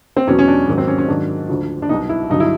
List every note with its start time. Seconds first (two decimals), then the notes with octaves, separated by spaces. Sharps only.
0.17 C4
0.27 E2 B2 F#3 C#4
0.39 C#4
0.48 D4
0.68 G#2 D#3 F#3
0.78 C4
0.88 C#4
0.98 C#4
1.08 G#2 D#3 F#3 D4
1.49 D2 D3 F3
1.82 D4
1.89 C2 B2 F#3 D#4
2.09 E4
2.30 G2 D3 F#3 D#4
2.40 E4